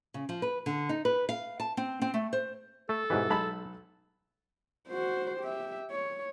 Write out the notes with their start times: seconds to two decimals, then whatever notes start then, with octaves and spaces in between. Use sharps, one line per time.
0.14 C#3
0.29 F3
0.42 B4
0.66 D3
0.89 D#4
1.05 B4
1.29 F5
1.60 A5
1.77 C4
2.02 C4
2.14 A3
2.33 C5
2.89 A3 A4
3.10 G#2 B2 E3 E4 G4 B4
3.30 B1 G#3 A5 B5
4.88 F#4 C5
5.40 G4 E5
5.91 C#5